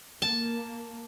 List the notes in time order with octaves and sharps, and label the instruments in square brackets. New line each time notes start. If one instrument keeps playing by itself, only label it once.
[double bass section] A#3 [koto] A5